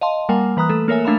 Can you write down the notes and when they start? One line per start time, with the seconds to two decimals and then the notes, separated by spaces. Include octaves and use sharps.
0.01 D#5 F5 A5 C6
0.29 G3 A#3 A#4 F#5 G#5
0.57 E3 B4 A#5 D#6 F#6
0.69 A3 A4
0.88 A#3 A#4 C#5 E5 G#5
1.05 A3 D4 F5 A#5 B5 E7